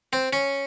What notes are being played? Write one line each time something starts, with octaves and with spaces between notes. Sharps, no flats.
C4
C#4